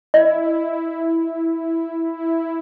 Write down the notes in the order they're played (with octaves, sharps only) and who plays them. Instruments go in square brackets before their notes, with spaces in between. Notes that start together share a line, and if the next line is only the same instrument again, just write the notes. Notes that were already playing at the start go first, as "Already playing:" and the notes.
[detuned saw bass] E4 [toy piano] D#5